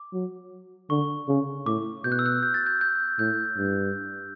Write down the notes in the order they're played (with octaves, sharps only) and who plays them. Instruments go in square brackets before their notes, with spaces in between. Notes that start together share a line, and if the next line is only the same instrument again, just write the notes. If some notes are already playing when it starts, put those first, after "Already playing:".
Already playing: [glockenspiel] D6
[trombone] F#3
[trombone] D3 [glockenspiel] C#6
[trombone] C#3
[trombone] A2 [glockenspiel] D6
[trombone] B2 [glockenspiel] G6
[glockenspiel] F#6
E6
F#6
G6
A6
G6
G6
[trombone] A2 [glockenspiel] G6
[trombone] G2